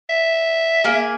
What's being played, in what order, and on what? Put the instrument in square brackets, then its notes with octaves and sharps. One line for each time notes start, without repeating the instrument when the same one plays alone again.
[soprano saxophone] E5
[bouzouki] A#3 G#4